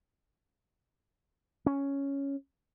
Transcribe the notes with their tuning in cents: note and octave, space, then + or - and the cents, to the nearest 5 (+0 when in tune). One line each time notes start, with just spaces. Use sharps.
C#4 +0